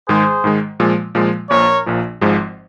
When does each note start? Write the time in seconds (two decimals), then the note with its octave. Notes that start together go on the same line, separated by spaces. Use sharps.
0.08 G#2 D#3 G#3 G#4 C5
0.44 G#2 D#3 G#3
0.80 A#2 F3 G#3
1.15 A#2 F3 G#3
1.50 A#1 A#2 F3 A#4 C#5
1.86 A#1 A#2 F3
2.21 G#1 G#2 F3 G#3